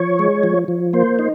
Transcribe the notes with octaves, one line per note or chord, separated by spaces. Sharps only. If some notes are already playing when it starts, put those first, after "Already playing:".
Already playing: F3 C#5
G#3
F3
F3
A#3 C5
D#4